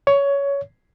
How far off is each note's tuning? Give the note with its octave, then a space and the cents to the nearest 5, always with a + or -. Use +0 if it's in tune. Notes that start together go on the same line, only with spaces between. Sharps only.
C#5 +15